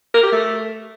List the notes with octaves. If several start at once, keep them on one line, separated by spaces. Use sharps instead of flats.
A#4
G4
A3